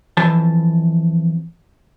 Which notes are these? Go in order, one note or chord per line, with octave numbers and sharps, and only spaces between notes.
F2 E3 A5